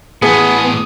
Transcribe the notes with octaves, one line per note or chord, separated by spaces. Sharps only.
A2 E3 B3 G#4 D#6